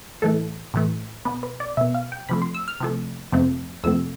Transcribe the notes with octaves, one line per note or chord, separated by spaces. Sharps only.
A2 E3 A3 A4
A2 E3 A3
B2 B3 B4
B4
D5
B2 B3 E5
F5
G5
C3 F3 A3 B5
C6
E6
F6
C3 F3 A3
F2 C3 F3 A3 C4
F2 C3 F3 A3 C4 E6